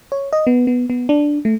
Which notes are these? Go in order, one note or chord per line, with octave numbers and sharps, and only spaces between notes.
C#5
D#5
B3
B3
B3
D4
A3